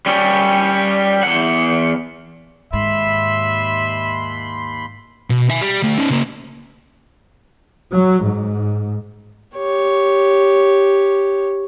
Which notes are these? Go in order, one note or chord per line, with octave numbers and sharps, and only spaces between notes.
G3 C#4
E2 F#5
D#2 G#2 E5 B5 C6
B2
E5 G#5
G3
D3 A3
C#4 D#4
C#3 A#3
F#3
G#2
G4 C#5